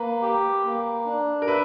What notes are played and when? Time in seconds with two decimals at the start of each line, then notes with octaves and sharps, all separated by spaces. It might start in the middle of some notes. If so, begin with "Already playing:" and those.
Already playing: A#3 B4
0.22 G4
0.65 A#3
1.06 D4
1.42 A#4
1.48 B4 E5